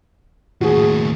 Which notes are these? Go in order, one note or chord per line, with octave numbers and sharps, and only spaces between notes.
D#2 A2 F#4 G#4